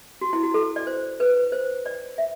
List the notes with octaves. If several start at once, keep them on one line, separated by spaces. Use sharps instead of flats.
F#4
E4
F#4
A4
D5
C5
B4
C5
D5
E5